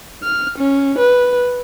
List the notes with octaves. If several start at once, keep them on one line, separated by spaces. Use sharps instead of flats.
F6
C#4
B4